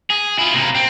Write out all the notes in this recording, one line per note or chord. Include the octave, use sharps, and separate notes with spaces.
G#4
E4 F4
C3 A#3
C4